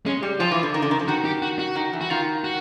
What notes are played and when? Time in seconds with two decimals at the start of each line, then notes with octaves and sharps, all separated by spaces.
0.06 G#3 C#4
0.23 G3
0.40 F3 F4
0.52 E3
0.63 D3
0.74 D#3
0.82 D3
0.91 D#3
0.99 F3
1.08 D#3 F#4
1.25 G4
1.42 F#4
1.59 F#4
1.76 D#3
1.93 E3
2.01 F#4
2.10 D#3 F4
2.44 F#4